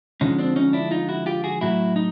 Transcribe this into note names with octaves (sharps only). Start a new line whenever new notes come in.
D3 F3 G#3 C#4 D#4
C4 D4
C#4 D#4
D4 E4
D#4 F4
E4 F#4
F4 G4
F#4 G#4
A2 F#3 E4 F#4
D#4